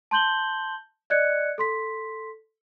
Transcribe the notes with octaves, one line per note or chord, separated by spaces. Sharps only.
A5 C6 G6 F#7 G7
D5 D#5 F#6 G#6 C#7
A4 C6 B6